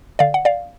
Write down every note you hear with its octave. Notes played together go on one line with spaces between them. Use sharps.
D3 D5 F5
F#5
D5 F5